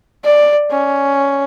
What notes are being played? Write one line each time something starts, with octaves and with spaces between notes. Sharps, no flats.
D5
C#4